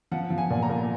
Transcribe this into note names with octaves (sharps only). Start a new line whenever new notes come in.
F3 F#5
F3
G#5
A#2
A#5
A#2